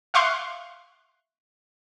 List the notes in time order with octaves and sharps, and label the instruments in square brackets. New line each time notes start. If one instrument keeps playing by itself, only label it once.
[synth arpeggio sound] E5 F5 C6 C#6 F#6